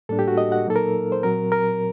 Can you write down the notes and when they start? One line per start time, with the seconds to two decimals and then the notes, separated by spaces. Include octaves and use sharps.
0.09 A2 G3 A#3 D4 A4
0.19 G4
0.28 F#4
0.38 D#5
0.52 F#5
0.66 A#2 F#3 A#3 D#4 A4
0.76 A#4
1.12 C5
1.23 A#2 F#3 C4 A#4
1.52 A#4